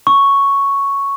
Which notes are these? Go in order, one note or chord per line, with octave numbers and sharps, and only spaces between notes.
C#6